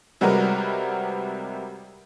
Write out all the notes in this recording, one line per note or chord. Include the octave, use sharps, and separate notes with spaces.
C3 G3 G#3 F#4 A#4 B4